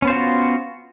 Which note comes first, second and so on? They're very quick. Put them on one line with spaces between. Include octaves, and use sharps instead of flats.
C#4 B3 C5 F4 F#4